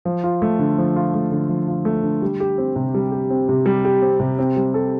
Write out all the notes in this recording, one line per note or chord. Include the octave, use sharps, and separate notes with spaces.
F3
F4
A3
D3
F3
F4
A3
D3
F3
F4
A3
D3
G3
G4
C4
C3
G3
G4
C4
C3
G3
G4
C4
C3
C4
G3
A4